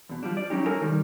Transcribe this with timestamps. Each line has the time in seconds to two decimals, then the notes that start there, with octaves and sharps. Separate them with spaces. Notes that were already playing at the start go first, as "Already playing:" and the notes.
0.09 E2 B2
0.23 F3 G3 D4
0.37 D5
0.50 F#3 C#4 D#4 G4
0.66 E4 A4 A#4 C#5 G#5
0.81 C2 D#3 G3